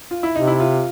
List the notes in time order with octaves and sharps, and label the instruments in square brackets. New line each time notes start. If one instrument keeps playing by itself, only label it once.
[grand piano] F4
E4
[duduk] C3 [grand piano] D#4
[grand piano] E4
F4